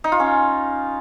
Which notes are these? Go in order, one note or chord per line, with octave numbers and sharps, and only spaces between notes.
D#4
F4
C#4